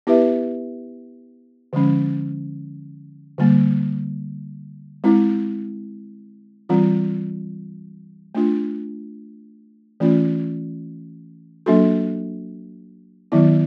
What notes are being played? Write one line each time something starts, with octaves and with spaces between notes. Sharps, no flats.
B3 E4 G4 B4 E5
D3 F3 G#3 C#4
D3 G3 A#3
G#3 C4 E4
E3 G3 C4 F4
A3 D4 F4
E3 A3 C#4 F4
F#3 A#3 D4 F#4 A4
D#3 F#3 B3 E4